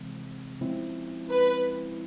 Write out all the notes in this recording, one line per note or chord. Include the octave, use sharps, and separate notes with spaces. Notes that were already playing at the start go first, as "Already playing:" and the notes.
Already playing: C3 E3 G#3 C4
C#3 F3 G#3 C4 E4
B4